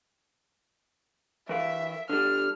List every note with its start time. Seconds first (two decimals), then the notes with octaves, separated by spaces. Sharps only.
1.49 E3 A#4 E5 F5
2.09 D3 G3 F6